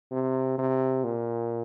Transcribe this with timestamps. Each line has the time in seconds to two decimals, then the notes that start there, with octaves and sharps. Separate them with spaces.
0.12 C3
0.58 C3
1.04 A#2